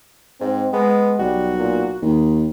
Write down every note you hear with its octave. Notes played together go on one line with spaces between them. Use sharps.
G#2 C4
G#3 B3
B1 G3 F#4
A#2
D#2 D#3